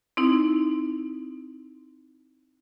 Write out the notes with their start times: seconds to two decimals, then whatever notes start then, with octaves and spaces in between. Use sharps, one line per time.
0.17 C4 D#4 E4